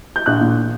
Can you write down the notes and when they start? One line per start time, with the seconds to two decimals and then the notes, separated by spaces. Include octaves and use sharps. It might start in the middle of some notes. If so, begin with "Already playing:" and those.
0.16 G6
0.26 A#1 F#6
0.41 A#2